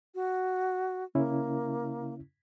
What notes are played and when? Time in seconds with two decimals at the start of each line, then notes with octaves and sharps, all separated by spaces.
0.15 F#4
1.15 C#3 A#3 C#4 E4